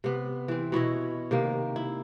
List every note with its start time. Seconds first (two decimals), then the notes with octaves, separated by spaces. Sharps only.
0.04 C3 B3
0.48 E3 C4
0.72 B2 E4 C#5 D#5
1.31 C3 D#3 A#3
1.76 E4